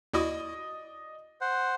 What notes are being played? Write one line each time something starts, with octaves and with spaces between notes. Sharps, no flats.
D#2 E4 F#4 D5 D#5 D#6
C5 F#5